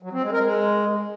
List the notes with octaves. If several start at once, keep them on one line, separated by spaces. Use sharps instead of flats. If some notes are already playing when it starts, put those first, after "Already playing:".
F#3
C4
G#3
A#4
G#3